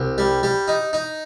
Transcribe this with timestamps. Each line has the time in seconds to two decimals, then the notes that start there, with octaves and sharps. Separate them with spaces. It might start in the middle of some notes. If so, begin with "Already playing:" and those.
Already playing: C2
0.18 G3
0.43 G3
0.68 D#4
0.93 D#4